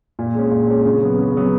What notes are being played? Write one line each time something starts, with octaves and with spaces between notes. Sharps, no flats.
A#2
G#3 C#4
A#2
G#3 C#4
C#3
F#3 B3
C#3
F#3 B3